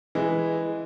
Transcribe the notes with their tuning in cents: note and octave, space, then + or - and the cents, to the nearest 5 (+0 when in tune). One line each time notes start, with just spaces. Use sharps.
E3 +0 G#3 +0